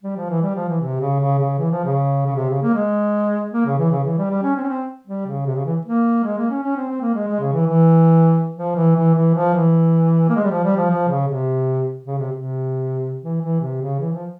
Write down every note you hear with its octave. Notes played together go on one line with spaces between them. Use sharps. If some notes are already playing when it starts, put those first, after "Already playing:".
G3
F3
E3
G3
F3
E3
C3
C#3
C#3
C#3
E3
F3
C#3
C#3
C3
C#3
A#3
G#3
A#3
C#3
E3
C#3
E3
G3
G3
C#4
C4
C#4
C4
G3
C#3
C3
C#3
E3
A#3
G#3
A#3
C#4
C#4
C4
C4
A#3
G#3
G#3
C#3
E3
E3
F3
E3
E3
E3
F3
E3
A#3
G#3
G3
F3
G3
F3
F3
C#3
C3
C#3
C3
C3
E3
E3
C3
C#3
E3
F3